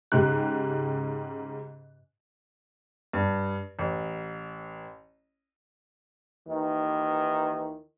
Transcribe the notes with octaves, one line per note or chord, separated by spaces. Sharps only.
G#2 C#3 G4 F#6
G2
A1
D#2 D#3 E3